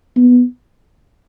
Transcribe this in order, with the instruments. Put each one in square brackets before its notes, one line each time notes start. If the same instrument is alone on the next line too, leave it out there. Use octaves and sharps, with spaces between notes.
[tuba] B3